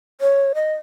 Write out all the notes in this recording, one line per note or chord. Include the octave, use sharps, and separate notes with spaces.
C#5
D#5